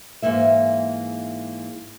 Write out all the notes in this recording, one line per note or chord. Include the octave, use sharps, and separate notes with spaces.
G#2 E3 A#3 E5